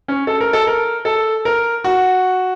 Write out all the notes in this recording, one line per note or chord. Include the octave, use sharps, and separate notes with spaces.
C#4
A4
A#4
A4
A#4
A4
A#4
F#4